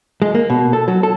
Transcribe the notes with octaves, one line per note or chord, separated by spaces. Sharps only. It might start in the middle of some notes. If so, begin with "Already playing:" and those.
G#3
A#3
B2
A4
F#3
A4